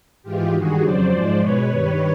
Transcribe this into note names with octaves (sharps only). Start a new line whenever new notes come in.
G#2 E3 G#3 F4 G4
G2 D#3 G3 F#4 G#4
F2 C#3 F#3 C5 D5
G#2 F3 G#3
B2 G#3 B4 C#5
G2 D#3 G3 B4 C#5